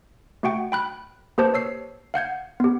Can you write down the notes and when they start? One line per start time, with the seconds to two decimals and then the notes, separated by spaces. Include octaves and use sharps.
0.43 A3 F#4 F#5 G5
0.72 G5 B5 F#6
1.38 A#3 G4 B4 C5 A5 G6
1.54 C#5 E6 C7
2.14 F5 F#5 G6 G#6
2.60 B3 G4